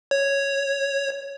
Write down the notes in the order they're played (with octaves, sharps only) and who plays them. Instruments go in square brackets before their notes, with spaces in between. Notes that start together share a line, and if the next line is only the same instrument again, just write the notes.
[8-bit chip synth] C#5